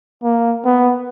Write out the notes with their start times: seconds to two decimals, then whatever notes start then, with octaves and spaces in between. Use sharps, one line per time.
0.24 A#3
0.65 B3